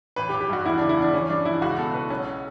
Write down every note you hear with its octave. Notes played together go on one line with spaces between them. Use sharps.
A1 B4
G4
A1
G4
G2 F#4
E2 E4
C#3 D4
E4
E2
D4
E3 C#4
G2 D4
E3 E4
C#2 F#4
B2 A4
C#2 B4
B1 C#4